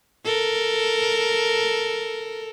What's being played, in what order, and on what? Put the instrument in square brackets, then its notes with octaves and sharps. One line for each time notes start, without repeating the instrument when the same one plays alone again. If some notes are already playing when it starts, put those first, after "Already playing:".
[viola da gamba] A4 A#4